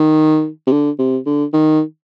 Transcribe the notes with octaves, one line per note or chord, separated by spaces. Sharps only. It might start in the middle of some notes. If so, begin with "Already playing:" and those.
Already playing: D#3
C3
D3
C3
D3
D#3